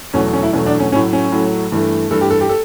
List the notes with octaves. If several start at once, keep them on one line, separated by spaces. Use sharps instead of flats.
E2 B2 F#3 A3 C#4
C#4
E4
E2 B2 F#3 A3 C#4
D4
C#4
A2 F#3 A3 C#4
C#4
A2 F#3 A3
G2 E3 A3
G2 E3 A3 A4
G4
A4
G4
A4